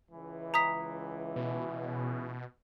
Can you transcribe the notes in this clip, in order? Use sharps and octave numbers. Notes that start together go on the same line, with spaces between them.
C#2 E3
A#5 D#6 B6
B2